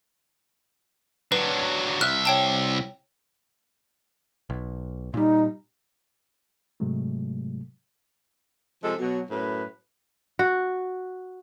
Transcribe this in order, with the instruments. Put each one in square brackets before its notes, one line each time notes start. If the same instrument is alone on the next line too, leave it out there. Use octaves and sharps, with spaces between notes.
[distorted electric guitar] F#3 D4 [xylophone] B4
[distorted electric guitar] C2 E5 [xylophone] F6 F#6
[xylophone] C#5 G5 A5
[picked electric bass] B1
[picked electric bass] A#2 G3 [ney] D#4
[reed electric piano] G#2 C3 F#3 G#3 A3
[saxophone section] C3 F3 G#3 A4
B2 F#3
F#2 A2 B4
[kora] F#4